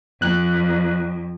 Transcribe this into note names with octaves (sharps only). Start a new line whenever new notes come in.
F2 F#6